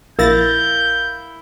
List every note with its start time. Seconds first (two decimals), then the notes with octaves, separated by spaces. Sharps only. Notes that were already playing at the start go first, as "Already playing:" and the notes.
0.19 A#1 E4 A#4 F5 G6 A6 A#6